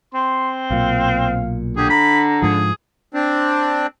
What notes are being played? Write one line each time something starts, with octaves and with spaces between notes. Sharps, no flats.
C4 C6
B1 A#2 F5
D3 G4 G#4
A#5 B5
G#2 F3 G#4
C4 D4